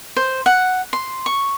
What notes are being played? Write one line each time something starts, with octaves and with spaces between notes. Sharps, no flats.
C5
F#5
C6
C#6